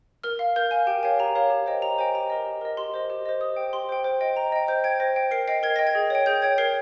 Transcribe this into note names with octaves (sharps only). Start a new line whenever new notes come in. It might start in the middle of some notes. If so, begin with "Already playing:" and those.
A#4 F6
F5
A#4 G6
F5 G#5
G4 G5
A#4 C#5 F5 G#5
G4 A#5
A#4 C#5 F5
G4
C5 D#5 G5
G4 A#5
C5 D#5 G5 G#5
G4 A#5
A#4 D#5
G4
A#4 D#5
G4 C6
C5 D#5
G4
C5 D#5
G4 D#6
C5 G5
G4 C6
C5 G5
C5
D#5 G5
C5 A#5
D#5 G5
C5 G6
G5 G#6
C5 A#6
G5
A#4 C7
D#5 G5 C7
A#4 G#6
D#5 G5 A#6
G#6
G#4
C#5 G5
G#4 G6
C#5 G5 G#6
A#4 C7